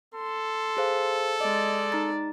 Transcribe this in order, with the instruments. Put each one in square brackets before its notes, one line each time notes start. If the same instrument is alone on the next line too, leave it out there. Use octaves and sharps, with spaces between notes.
[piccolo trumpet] A4 [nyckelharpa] C6
[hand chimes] G#4 C5 F5
[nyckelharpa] G#3 D5 [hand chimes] D#5
[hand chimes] D#4 A#5 A6